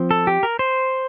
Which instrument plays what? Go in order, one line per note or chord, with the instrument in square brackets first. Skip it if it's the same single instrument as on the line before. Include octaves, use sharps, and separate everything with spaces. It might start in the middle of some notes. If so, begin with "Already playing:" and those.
Already playing: [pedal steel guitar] F3 C4
A4
G4
A#4
C5